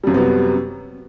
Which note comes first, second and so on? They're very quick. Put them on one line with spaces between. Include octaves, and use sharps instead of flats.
G3 F#2 C3 B3 F#3